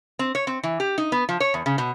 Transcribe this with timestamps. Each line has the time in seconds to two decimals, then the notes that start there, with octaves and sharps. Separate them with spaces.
0.19 C4
0.35 C#5
0.47 C4
0.63 E3
0.80 G4
0.98 D#4
1.12 B3
1.29 F3
1.40 C#5
1.54 E2
1.66 C#3
1.78 B2